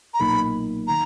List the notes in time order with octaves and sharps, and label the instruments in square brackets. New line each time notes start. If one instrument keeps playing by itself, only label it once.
[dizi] A#5
[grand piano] B1 A#2 A#3 D#4 [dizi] B5
[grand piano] D#3 [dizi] A#5